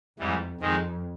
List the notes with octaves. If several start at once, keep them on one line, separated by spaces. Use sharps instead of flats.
F2 G#2 E3 G3
F2 D#3 G#3 C4 D#4